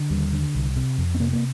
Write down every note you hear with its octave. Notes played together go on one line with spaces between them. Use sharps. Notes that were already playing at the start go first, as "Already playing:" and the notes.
Already playing: D3
D#2 G3
D3
C2
C3
F2
C4
C3 A#3
A#3